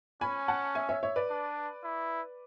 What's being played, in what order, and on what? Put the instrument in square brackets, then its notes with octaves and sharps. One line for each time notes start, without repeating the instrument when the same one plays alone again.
[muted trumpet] C#4 [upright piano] G#5 B5
[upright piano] F#5 A5
E5 G#5
C#5 E5
C#5 E5
B4 D5
[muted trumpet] D4
E4